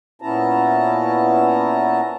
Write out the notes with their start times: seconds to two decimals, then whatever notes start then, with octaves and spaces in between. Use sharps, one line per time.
0.22 A#2 B3 C#4 E4 A5 A#5